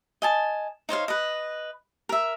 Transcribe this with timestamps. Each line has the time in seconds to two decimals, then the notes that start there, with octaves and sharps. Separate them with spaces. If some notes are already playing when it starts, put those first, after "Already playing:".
0.22 D#5 G#5 A5
0.89 D#4 C5 C#5 F5
1.08 B4 D#5
2.09 A#4 E5